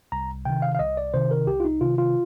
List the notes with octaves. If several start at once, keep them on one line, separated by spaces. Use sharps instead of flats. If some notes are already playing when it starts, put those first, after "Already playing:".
C2 A#5
C3 D#3 G5
F5
F5
C2 D#5
D5
C3 D#3 C5
A#4
C2 G4
F4
D#4
C3 D#3 F4
F4